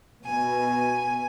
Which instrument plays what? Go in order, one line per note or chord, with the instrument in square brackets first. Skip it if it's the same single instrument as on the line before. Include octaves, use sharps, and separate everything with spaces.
[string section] B2 [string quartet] G#5